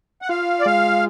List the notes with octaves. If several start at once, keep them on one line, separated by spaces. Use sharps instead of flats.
F#5
F4 F5
D5
G#3 F5